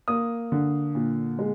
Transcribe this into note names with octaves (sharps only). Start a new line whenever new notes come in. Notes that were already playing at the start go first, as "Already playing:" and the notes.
A#3 D#6
D3
A#2
G#3